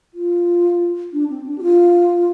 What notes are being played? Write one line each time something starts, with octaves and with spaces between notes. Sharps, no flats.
F4
D4
C4
D4
G4
F4